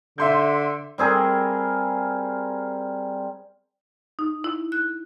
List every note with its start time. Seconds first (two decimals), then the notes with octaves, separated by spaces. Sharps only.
0.18 D3 E5 C6 G6
0.98 G3 C4 G#4 A#4
4.19 D#4
4.44 E4
4.72 F#6